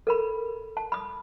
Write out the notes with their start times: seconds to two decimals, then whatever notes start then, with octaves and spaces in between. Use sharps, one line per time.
0.07 A4 A#4 B5
0.77 A5
0.92 B5 D#6